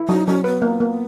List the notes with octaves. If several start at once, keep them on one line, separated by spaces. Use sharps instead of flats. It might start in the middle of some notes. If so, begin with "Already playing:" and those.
Already playing: E4
F#3 D#4
F#3 C#4
B3 B4
A#3
A#3